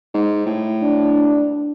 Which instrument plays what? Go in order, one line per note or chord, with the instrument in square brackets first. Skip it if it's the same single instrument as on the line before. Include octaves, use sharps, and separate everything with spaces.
[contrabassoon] G#2
A2
[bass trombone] D4